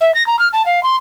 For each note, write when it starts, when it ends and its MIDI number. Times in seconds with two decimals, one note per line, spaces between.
0.01 0.14 76
0.14 0.26 94
0.26 0.38 82
0.39 0.48 89
0.53 0.65 81
0.66 0.83 77
0.83 0.96 84